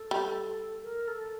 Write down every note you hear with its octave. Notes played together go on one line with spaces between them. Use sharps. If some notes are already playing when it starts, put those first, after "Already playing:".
Already playing: A4
G3
A#4
A4